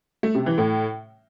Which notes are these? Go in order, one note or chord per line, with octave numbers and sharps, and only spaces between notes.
A3
C3
E3
A2